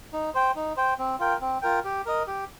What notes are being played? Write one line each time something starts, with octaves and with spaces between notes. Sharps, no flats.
D#4
C5 G5
D#4
C5 G5
C4
F4 A#4 G5
C4
F4 A#4 G5
G4
A#4 D#5
G4